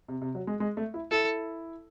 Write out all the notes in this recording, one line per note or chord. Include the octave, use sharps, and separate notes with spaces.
C3
C3
F#3
G#3
G#3
A3
E4
E4 A4